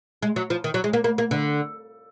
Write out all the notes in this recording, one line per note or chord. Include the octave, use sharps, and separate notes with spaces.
G#3
F#3
F3
D#3
F#3
G#3
A#3
A#3
A#3
D3